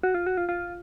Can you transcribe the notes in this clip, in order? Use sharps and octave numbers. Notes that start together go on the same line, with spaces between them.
F#4
F4
F#4
F4
F4